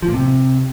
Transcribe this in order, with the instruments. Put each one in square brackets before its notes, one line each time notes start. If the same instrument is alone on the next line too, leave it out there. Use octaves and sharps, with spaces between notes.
[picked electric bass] F3
A#2
C3